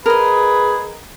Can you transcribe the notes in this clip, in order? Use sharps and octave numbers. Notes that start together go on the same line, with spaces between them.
G#4 A#4 B4 D#5